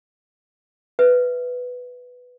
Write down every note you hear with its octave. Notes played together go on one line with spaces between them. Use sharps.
B4 E5